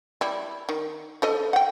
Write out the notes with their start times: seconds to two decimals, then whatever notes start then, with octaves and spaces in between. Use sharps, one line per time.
0.21 G3 E4
0.69 D#3
1.22 F3 A4 D#5
1.53 F#5 G5